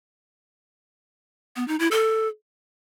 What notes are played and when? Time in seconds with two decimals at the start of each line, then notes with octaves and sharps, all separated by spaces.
1.56 B3
1.68 D#4
1.80 E4
1.91 A4